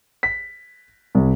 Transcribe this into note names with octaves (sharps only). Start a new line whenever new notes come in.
B6
C2